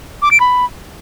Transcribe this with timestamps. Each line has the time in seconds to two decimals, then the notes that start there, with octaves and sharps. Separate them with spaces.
0.22 D6
0.31 D7
0.40 B5